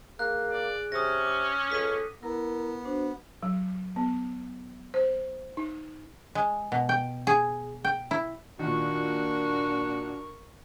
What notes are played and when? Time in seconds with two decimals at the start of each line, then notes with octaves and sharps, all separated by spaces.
0.19 A#3 G#4 F#6
0.51 D5
0.92 C3 C#4 D#6 A#6
1.27 D6
1.72 C#2 A4 B6 D#7
2.23 B3 E4 A#4 A#5
2.85 D4 F#4 C5
3.43 F#3
3.96 B3
4.94 C5
5.57 D#4
6.35 G#3
6.72 B2
6.89 G5
7.27 G#4
7.85 G5
8.11 E4
8.59 A#2 D#3 D4 F#4 A#4 C#6